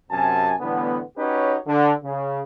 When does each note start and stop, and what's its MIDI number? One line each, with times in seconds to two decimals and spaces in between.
0.11 0.53 42
0.11 0.53 48
0.11 0.53 80
0.11 0.53 81
0.60 0.99 45
0.60 0.99 50
0.60 0.99 52
0.60 0.99 55
0.60 0.99 59
1.18 1.56 61
1.18 1.56 63
1.18 1.56 66
1.18 1.56 67
1.18 1.56 71
1.18 1.56 73
1.67 1.92 50
2.04 2.41 49